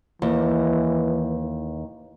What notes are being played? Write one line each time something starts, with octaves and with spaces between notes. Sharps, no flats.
D#2 E3